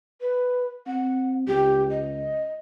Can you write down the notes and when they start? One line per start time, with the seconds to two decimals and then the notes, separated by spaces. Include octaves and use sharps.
0.21 B4
0.87 C4 F#5
1.48 C#2 G4
1.90 D#5